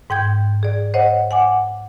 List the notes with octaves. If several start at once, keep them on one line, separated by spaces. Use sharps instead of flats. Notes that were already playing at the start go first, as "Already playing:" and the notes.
G#2 G5 G6 G#6
G#4 D5
C5 C#5 D#5 F#5
F#5 G#5 D6